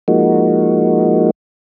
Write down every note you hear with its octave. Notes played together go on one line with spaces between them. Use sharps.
F3 G#3 A#3 D#4 F#4